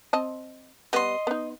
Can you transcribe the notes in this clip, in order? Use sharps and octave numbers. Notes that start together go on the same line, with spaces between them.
C4 D#5 A5
G3 B3 D#5 C6
B3 D#4